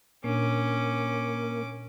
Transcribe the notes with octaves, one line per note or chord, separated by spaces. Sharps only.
A#2 A#3 C#4 D4 D6